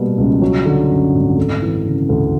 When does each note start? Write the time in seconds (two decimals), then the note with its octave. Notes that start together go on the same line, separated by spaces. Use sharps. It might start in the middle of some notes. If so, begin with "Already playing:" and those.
Already playing: B2 G3 A#3
0.18 C#2
0.41 F#3
0.65 D3
0.90 F#2
1.14 G#1
1.37 A3
1.62 E3
1.85 C#3
2.09 D2